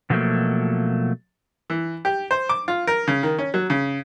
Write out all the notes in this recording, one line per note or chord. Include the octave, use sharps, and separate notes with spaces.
B2 D3 F3 F#3 A3 A#3
E3
G4
C5
D6
F4
A#4
C#3
D#3
C#4
F#3
C#3